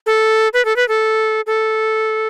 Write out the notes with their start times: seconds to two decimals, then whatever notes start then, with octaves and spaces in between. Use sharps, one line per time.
0.06 A4
0.54 B4
0.65 A4
0.76 B4
0.88 A4
1.47 A4